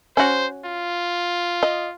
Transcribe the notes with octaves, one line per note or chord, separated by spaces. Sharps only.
C#4 F#4 C5
F4
D#5